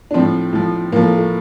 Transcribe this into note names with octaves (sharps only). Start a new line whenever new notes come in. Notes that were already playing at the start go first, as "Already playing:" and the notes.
D4
A2 F3 C4
A2 F3
A2 F3 A#3
A3
A3